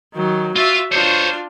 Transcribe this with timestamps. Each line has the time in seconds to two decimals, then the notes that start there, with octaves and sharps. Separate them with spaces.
0.14 D#3 F#3
0.56 F4 F#4 E5
0.92 D4 F4 C5 C#5